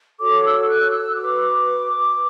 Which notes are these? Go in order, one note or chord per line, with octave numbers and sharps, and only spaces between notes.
F#4 A4 C#5 D6
E6
F#6
E6
F#4 B4 D6